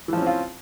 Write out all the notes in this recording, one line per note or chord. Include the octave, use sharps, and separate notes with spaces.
E3 F3 C4 C#4 F4